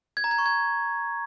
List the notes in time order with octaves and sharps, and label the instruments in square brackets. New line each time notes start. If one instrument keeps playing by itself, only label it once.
[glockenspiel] G#6
A#5
G#6
C#6
G#6